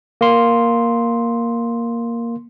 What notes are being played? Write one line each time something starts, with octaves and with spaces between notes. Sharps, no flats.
A#3 C6